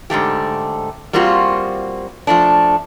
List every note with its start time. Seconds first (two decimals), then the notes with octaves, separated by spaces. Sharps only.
0.10 G#2 D3 A3 G4
1.13 G3 A#3 C4 F4 F#4
2.27 F3 A3 D4